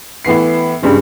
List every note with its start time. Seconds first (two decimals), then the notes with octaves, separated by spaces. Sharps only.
0.25 A2 E3 B3 C7
0.82 G2 C#3 G3 G#3